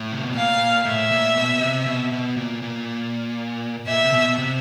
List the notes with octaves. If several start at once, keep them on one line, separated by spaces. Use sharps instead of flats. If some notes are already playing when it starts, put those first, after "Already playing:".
Already playing: A2
C3
B2
A#2 F5
A2 E5
A#2
B2
C3
B2
B2
A#2
A#2
A#2 E5
C3
B2
C3